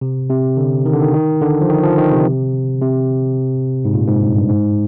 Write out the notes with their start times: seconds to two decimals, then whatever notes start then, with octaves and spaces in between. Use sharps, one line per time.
0.01 C3
0.29 C3
0.57 D3
0.85 D#3
0.93 D3
1.01 D#3
1.14 D#3
1.42 D3
1.61 F3
1.69 D#3
1.83 F3
1.98 D#3
2.11 C3
2.82 C3
3.85 G#2
3.94 A#2
4.07 G#2
4.21 G2
4.36 G2
4.49 G#2